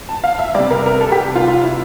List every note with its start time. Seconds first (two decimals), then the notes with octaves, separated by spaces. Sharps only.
0.09 A5
0.24 F5
0.39 E5
0.55 C3 G3 D5
0.71 A#4
0.86 A#4
1.01 A4
1.12 G4
1.36 F4
1.48 F4
1.63 E4